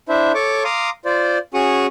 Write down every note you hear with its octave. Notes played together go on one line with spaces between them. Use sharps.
D4 E4 C5 E5
A4 C#5 C#6 D6
F5 A#5 C6 D6 D#6
F4 C5 D5
C#4 F#4 G#4 C#6 D#6